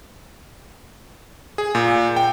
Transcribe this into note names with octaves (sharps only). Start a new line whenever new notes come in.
G#4
A#2
G5